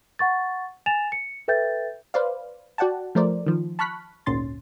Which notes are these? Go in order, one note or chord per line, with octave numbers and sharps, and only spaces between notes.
F#5 C#6 A6
G#5 A6 E7 F7
C#7
A4 B4 E5 G5 G6 A6
B4 C5 D5 F5
F#4 D5 F#5 G5 A5
F3 A3 A#4 C5 D5
D#3 F3
A5 B5 C#6 F6 F#6 B6
G#1 D2 A#2 C#4 C6 A6